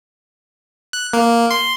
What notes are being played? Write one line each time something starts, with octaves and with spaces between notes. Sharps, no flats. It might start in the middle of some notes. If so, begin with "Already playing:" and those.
F#6
A#3
C6